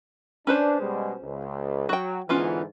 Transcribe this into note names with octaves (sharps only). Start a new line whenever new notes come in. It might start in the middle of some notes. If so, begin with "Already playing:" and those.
C#4 D4 B4 C5
B2 G3 G#3
C#2
F#3 F#4 G5
G#2 D3 E3 B3 C#4 F4